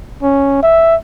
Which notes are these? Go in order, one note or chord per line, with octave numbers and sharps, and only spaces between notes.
C#4
E5